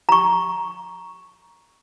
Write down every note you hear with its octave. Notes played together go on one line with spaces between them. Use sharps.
A#5 C#6